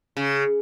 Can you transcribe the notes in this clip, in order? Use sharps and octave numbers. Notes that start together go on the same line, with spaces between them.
C#3